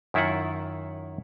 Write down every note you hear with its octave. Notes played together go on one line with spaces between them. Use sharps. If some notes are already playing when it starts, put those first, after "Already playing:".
F#2 D#3 E4 F4 E5 F#5